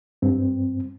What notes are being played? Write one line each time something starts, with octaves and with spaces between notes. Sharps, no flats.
G2 C4